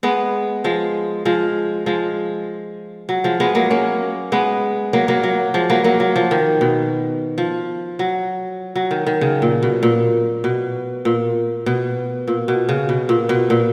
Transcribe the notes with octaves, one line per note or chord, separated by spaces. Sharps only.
G#3 B3
F3 G#3
F3 G#3
F3 G#3
F#3
F3 G#3
G#3 B3
F#3 A#3
A#3 C#4
G#3 B3
F#3 A#3
F#3 A#3
F#3
F3 G#3
F#3 A#3
F#3 A#3
F#3
F3
D#3
B2
F3
F#3
F#3
D#3
D#3
C#3
A#2
B2
A#2
B2
A#2
B2
A#2
B2
C#3
B2
A#2
B2
A#2